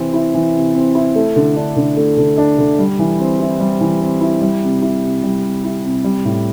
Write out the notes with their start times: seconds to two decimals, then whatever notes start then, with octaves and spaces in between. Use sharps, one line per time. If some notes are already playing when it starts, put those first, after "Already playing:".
Already playing: C3 E3 C4
0.13 E4
0.34 E3
0.55 C3
0.75 C4
0.95 E4
1.16 A3
1.36 D3
1.56 D4
1.76 D3
1.97 A3
2.17 D3
2.38 D4
2.58 D3
2.79 G3
2.99 E3
3.19 C4
3.40 E4
3.60 G3
3.81 E3
4.01 C4
4.21 E4
4.41 G3
4.62 C3
4.82 E4
5.02 C3
5.23 G3
5.43 C3
5.64 E4
5.84 C3
6.04 G3
6.25 A2